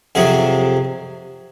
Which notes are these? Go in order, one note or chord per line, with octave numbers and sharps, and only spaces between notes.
F2 C3 F#3 G#4